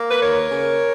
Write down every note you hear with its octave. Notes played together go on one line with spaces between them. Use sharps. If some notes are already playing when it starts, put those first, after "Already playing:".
Already playing: A#3
B4
D#2 A#4 C#5
C#3